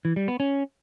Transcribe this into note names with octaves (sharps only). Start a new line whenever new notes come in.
E3
G3
B3
C#4